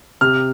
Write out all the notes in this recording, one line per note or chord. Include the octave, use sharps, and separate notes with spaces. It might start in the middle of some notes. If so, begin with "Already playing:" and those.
C3 F6